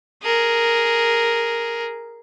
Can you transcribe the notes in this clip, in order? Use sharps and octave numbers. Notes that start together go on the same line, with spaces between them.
G#4 A#4